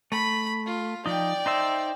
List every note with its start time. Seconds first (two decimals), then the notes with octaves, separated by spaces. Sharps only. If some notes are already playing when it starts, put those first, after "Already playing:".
0.12 A3 B5
0.66 F4
1.06 F3 D#4 D5 G5
1.46 D#4 C5 E5